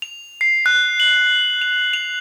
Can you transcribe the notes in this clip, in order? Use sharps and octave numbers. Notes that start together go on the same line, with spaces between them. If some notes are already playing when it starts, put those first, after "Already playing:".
F7
C7
F#6
F#7
F7
F7